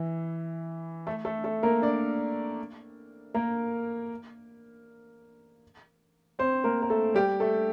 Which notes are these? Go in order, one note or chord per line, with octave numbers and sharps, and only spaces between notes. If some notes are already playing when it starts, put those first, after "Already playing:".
Already playing: E3 E4
A3 A4
A3 A4
A3 A4
A#3 A#4
D4 D5
A#3 A#4
C4 C5
A#3 A#4
A#4
A3 A4
G3 G4
A3 A4